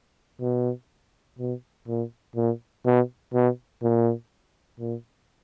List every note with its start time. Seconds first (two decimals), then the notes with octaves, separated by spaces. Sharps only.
0.41 B2
1.39 B2
1.88 A#2
2.35 A#2
2.85 B2
3.34 B2
3.82 A#2
4.80 A#2